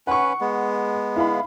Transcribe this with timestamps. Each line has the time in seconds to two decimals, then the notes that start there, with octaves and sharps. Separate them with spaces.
0.07 C#4 B4 F#5 C#6
0.41 G#3 B3
1.16 E4 F5 B5